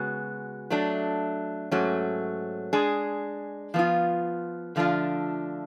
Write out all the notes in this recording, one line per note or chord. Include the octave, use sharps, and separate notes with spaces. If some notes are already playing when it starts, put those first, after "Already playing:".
Already playing: C#3 G#3 B3 F#4
F#3 A3 D4
G#2 F#3 A3 C#4
G#3 D4 G#4
F3 B3 F4
D3 F3 A3 D4 F4